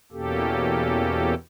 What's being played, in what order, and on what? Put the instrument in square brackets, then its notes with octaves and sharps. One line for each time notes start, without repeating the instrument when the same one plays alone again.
[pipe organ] E2 B2 A#3 C#4 G4 A4